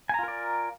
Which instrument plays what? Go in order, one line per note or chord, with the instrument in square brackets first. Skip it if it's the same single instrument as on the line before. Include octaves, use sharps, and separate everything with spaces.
[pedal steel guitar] G#5
A#5
F4
A#4
D5